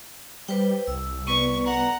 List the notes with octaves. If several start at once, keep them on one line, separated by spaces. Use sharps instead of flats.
G3 B4 C5 G5
C2 E6
B3 B4 D5 C#6
F#5 A#5